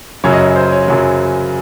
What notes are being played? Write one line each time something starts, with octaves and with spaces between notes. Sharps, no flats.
F#2 C#3 F#3 C#5
D#5
C#5
C5
C#5
F#2 C#3 F#3